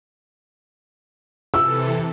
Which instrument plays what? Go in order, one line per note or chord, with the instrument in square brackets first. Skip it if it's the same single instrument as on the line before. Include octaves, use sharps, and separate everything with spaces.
[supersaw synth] C3 E3 A4 [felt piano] E6